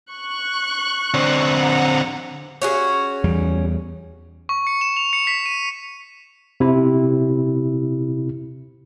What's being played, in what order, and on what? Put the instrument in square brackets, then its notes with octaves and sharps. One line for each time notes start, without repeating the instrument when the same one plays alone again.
[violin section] C#6 F#6
[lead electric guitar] D3 C4
[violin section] F#5 A#5
[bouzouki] C#4 F#4 G#4
[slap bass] E2 G3
[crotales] C#6
C#7
E7
F7
C#7
B6
D#7
[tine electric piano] C3 E4